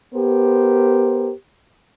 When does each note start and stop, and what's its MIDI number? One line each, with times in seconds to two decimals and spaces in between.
0.14 1.32 59
0.14 1.32 67
0.14 1.32 70
0.14 1.32 72